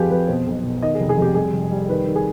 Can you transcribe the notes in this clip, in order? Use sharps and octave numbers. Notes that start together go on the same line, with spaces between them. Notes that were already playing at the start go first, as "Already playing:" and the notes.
Already playing: F2 F3 G4 G#4 B4
F2 B4
B2 C5
B1
B2
D#3 D#5
G#4
F1
G#4
F2 G4
G3 G#4
F1
G3
D#3 B4
D#3
G#4